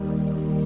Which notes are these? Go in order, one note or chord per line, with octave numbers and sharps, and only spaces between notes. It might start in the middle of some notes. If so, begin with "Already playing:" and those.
Already playing: D#2 D#3 G3